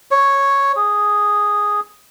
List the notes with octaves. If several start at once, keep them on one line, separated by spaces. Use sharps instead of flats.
C#5
G#4